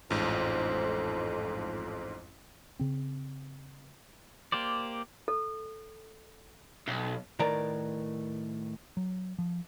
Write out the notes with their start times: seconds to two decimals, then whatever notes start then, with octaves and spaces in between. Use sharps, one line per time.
0.10 A1 F2 G#2
2.79 C#3 C4
4.52 A#3 G4 C5 D5
5.28 A4
6.88 B1
7.39 A2 D#3 A#4 B4 D5 A#5
8.97 F#3
9.39 F3